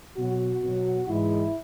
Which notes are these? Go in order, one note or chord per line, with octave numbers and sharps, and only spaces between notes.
B2 F#3 F#4
B2 F#3
G#2 E3 G#3 E4